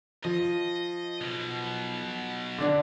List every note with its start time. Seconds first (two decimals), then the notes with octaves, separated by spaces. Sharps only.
0.25 F3 D#5
1.21 B1 B2
2.58 D3 D4 D5